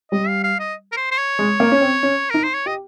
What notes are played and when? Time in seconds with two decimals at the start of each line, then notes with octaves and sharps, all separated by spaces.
0.12 G3 D#5
0.28 F5
0.44 F5
0.60 D#5
0.92 A#4
0.96 C5
1.11 C5
1.18 C#5
1.39 G#3
1.60 A#3
1.72 C#4
1.81 C4
2.03 C#4
2.30 D#4 A#4
2.43 C5
2.54 C#5
2.66 G4 D#5